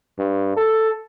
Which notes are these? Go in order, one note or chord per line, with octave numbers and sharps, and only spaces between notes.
G2
A4